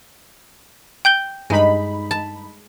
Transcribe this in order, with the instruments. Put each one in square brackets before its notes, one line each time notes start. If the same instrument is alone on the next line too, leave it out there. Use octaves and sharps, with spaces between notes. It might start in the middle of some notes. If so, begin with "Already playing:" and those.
[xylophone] G5 G6 G7
[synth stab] G2 D#4 B5 [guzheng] G#3
[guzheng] A5